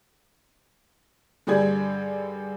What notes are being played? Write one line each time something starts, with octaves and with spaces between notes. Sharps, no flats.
G2 D3 G4 G#4 D5 G#6